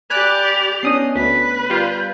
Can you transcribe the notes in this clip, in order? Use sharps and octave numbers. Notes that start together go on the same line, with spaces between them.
G4 D5 G#5 B5 F#6 F7
B3 C#4 D4 D#5 D#6 C7
D2 B4 B6
G3 F4 G6